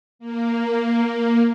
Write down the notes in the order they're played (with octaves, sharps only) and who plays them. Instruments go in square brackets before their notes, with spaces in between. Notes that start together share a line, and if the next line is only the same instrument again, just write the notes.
[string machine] A#3